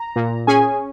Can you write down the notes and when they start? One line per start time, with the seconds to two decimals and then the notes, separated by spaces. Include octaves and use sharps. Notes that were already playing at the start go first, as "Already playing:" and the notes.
Already playing: A#5
0.16 A#2
0.47 C#4 G#4 G#5